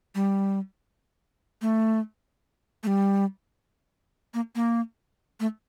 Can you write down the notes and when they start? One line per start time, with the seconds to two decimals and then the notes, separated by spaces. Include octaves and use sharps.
0.15 G3
1.62 A3
2.83 A3
2.87 G3
4.34 A#3
4.55 A#3
5.40 A3